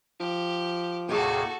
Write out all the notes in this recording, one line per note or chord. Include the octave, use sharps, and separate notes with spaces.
F3 G4
D#2 A2 C3 F#4 G#4 A4 C#5 G5